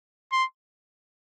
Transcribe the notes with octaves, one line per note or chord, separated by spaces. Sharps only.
C6